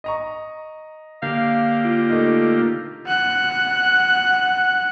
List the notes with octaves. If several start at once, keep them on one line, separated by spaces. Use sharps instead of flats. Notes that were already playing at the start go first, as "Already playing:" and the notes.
D#5 A#5 C#6
D3 A#3 G4 F5
F4
A3 D#4
F#5 F#6